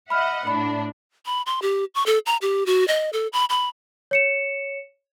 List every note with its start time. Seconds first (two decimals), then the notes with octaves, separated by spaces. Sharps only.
0.10 D#5 E5 F#5 B5 F6
0.47 A2 D4 B5
1.26 B5
1.46 C6
1.62 G4
1.95 C#6
2.06 A4
2.26 A#5
2.42 G4
2.66 F#4
2.88 D#5
3.13 A4
3.33 B5
3.50 B5
4.11 C#5 C#7 E7